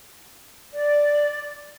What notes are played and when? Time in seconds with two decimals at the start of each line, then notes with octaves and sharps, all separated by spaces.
0.73 D5